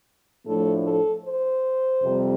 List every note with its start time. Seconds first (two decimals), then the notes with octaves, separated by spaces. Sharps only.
0.45 A2 F3 A3 D4 A4
0.84 A4
1.24 C5
2.03 F2 C3 G3 C4